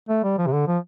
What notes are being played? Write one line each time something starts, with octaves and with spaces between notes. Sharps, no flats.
A3
G3
F3
C3
D3
F3